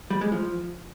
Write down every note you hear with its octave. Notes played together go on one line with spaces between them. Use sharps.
G3
G#3
F3